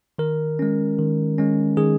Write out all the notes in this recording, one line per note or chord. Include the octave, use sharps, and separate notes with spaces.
D#3 A#4
G#3 C#4
D#3
G#3 C#4
D#3 G#4